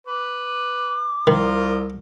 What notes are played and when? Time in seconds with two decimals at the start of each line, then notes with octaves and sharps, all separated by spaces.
0.07 B4 D6
1.27 C2 D#3 F4 A#4 C5